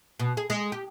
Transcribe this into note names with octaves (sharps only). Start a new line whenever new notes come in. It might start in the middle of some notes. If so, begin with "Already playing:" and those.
B2
G#4
G#3
G4